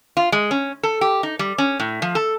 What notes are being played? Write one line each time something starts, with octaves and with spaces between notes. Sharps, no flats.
F4
G#3
C#4
A4
G4
D#4
G3
C#4
A2
F3
A4